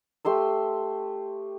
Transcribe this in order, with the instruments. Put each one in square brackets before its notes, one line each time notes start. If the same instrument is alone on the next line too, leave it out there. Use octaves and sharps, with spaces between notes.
[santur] A3 G4 C6 E6